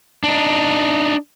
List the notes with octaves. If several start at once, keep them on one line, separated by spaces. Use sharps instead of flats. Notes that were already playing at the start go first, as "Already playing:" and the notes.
D4 D#4